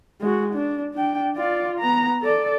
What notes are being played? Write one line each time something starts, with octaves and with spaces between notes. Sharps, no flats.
G#3 F#4
D4
D4 G5
F4 D5
B3 A#5
A4 D5